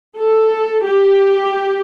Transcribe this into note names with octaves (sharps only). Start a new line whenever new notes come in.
A4
G4